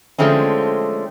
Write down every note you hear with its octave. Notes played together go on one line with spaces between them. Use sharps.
D3 F3 G#3 A3 C4 C#4